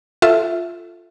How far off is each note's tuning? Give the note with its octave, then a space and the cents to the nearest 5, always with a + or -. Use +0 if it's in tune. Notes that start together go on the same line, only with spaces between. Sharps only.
F4 +0 A4 +0 E5 +0